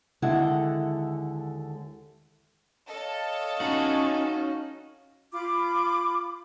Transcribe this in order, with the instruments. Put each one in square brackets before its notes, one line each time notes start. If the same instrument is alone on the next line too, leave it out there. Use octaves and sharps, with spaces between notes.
[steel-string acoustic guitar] D#2 D3 G#3 E4 A4 F#5
[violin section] A4 C#5 [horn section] D#5 F5
[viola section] C#4 [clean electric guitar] D#4 F#4
[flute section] F4 B5 D6